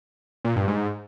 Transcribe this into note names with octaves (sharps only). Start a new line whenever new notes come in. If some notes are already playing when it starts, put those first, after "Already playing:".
A#2
G2
G#2